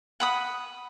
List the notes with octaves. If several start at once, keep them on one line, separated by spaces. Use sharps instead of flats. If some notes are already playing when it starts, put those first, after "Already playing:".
F#5 B5 D#6